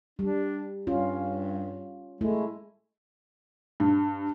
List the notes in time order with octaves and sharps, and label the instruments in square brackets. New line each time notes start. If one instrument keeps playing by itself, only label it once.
[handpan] G3 [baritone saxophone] D4
[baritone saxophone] G2 [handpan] C#4 F4
[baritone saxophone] G#3 [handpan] A3 E4
[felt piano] G2